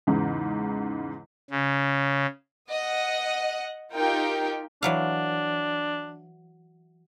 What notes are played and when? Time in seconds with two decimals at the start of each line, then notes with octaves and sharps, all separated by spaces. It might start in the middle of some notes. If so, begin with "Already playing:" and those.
0.07 E2 G#2 C#3
1.50 C#3
2.69 D#5 F#5
3.93 D#4 F4 G4 A#4 G5
4.83 E3 F#3 D4 F5